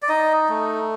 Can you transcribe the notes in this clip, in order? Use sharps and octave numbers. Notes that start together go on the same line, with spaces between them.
D5
D#4 D#5
A3